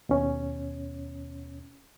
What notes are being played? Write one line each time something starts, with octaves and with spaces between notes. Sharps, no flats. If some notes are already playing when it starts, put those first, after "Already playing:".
D#2 B2 C#4